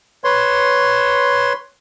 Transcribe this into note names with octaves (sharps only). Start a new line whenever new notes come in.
B4 C#5 C6